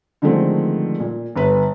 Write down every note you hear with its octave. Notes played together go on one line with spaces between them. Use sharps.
D3 D#3 F3 G#3 A3 C4
A#2
G1 B4